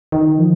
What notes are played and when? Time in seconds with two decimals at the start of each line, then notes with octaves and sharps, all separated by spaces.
0.12 D#3
0.38 F3